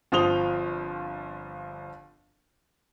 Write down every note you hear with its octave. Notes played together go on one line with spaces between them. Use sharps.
G1 F3 C4 D#6 F7 G7